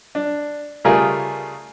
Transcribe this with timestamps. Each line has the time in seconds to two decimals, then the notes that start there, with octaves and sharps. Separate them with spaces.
0.15 D4
0.85 C#3 G3 A3 F4 G#4 A#4